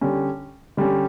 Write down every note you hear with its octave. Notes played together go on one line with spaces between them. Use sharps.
D3 G3 C#4
D3 G3 C#4